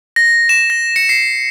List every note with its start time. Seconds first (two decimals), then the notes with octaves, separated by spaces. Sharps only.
0.16 A#6
0.49 E7
0.70 A#6
0.96 C#7
1.09 C7